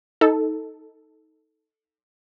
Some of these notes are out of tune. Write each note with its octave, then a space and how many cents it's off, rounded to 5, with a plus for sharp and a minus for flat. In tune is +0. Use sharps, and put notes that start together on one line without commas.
D#4 +20 A4 +0